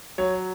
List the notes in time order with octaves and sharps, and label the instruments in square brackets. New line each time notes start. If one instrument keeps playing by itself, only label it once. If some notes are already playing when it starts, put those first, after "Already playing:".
[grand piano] F#3 C#5